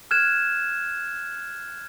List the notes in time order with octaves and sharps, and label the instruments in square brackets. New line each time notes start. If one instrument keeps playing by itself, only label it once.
[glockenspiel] F6 F#6 G#6 E7